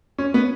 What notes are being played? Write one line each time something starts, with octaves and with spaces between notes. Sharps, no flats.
C#4
B3